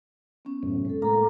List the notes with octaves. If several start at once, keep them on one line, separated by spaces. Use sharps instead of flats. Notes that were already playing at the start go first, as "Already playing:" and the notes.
B3 C#4
F#2 A2 C3
G#3 A4
A2 A#3 A4 A#5